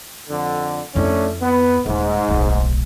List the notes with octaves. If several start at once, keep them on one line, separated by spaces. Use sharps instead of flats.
F2 D3
F2 A3 C#4 D4 E4
B3
D#1 G#2 D#4
D1 B1